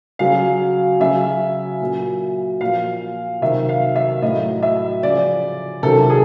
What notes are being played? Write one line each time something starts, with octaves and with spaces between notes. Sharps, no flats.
C#3 F#3 F5
C#3 F#3 E5
A#2 F#3
A#2 F3 F5
C3 D#3 F#3 E5
F5
E5
A2 F#3 D#5
E5
C#3 F3 D5
C3 D#3 F#3 A4
G#4